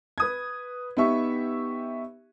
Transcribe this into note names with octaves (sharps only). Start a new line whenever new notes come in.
B4 D#6 G#6
B3 D#4 G4 E5 C#6